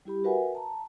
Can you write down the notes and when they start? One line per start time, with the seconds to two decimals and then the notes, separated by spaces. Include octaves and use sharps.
0.05 G3 E4 G4 B5
0.24 F#4 A#4 B4 E5 F#5 G#5
0.55 A5 A#5